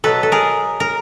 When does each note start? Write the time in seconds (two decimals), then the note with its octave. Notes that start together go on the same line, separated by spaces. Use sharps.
0.04 B2 F#3 B3 A4 B4
0.23 A4
0.32 G#4 A#4
0.80 A#4